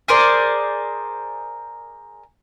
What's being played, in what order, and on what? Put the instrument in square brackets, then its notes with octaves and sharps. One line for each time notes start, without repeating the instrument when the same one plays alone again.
[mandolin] G#4 A#4 C5 D5